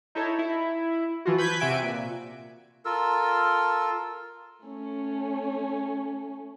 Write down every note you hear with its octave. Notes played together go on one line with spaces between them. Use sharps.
D#4 E4 A4 C#5
E4
E3 F3 F4 F#4
B4 G6 G#6 B6
C3 F#4 E5 G#5 D7
A#2
F4 A4 A#4 E6
A3 C#4